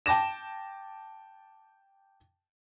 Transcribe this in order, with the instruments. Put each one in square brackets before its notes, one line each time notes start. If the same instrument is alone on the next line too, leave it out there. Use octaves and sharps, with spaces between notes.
[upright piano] G5 A5 D6 A#6 E7